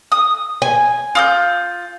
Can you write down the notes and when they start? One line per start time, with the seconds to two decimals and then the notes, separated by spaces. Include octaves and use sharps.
0.12 D#6
0.62 G#5
1.15 F4 D#6 G6